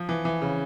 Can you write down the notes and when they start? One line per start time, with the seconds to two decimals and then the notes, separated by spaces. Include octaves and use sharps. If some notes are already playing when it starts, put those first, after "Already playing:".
Already playing: F3
0.09 E3
0.25 E3
0.42 C#3